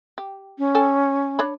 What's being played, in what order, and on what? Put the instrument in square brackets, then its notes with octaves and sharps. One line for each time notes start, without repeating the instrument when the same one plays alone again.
[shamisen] G4
[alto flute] C#4
[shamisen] A4 G5 G#5
D4 C#5 B5